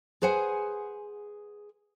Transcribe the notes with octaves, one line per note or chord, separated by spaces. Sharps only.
G#4 B4 C5 F#5 G#5